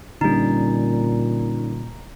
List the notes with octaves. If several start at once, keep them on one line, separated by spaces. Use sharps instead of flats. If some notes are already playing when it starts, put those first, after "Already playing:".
A#2 D3 G3 C#4 D#4 A#5